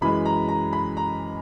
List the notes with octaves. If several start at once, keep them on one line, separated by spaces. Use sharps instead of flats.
F#2 E3 G#3 B5
A#5
A#5
B5
A#5